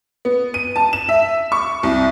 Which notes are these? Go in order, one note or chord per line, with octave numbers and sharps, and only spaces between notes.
B3
D#7
A5
E7
E5
C#6
C2